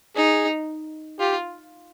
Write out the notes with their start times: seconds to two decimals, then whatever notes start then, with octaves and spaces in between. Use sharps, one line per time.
0.16 D#4 G#4
1.19 F4 G4